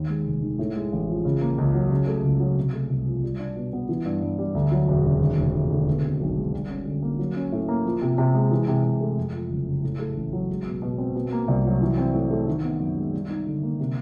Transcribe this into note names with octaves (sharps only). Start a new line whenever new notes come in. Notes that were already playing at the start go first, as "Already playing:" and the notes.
Already playing: D#2
G#3
F1
D#3
A2
G#3
A1
F3
C#3
A#3
C#2
F#3
C#3
A3
C#2
F#3
C3
A3
C2
F3
G3
D4
B2
B3
E3
G2
G2
G3
D2
F#3
E1
C#3
D#2
F1
F1
D3
B2
C4
B1
G#3
G3
C#4
D3
A#3
F#3
C#4
A2
A#3
F3
C3
C3
G#3
E3
C3
C3
A3
F2
F3
F#1
C#3
A2
A3
A1
F#3
G#3
B2
B2
C4
B2
A#3
C2
F#3
E3
C4
A2
A3
D#3
B3
F#2
G#3
G3
D#4
D3
A#3
C3